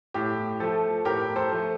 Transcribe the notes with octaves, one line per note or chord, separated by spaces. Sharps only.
A2 G4
F3 A3 A4
A2 G4 A#4
A4 C5
F3 A3